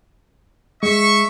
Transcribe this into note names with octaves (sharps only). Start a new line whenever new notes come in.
G#3 E5 C#6